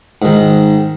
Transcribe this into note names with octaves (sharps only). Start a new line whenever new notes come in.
G#2 D#3